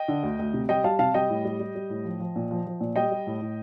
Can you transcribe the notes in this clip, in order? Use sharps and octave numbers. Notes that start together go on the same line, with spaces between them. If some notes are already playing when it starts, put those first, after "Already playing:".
Already playing: D#5 G5
D3
D2
D2
C3
G3 D#5 G5
G3 F5 A5
C3 F5 A5
G3 D#5 G5
A2
G3
G3
G3
A2
F3
F3
A#2
F3
F3
A#2
G3 D#5 G5
G3
A2
A2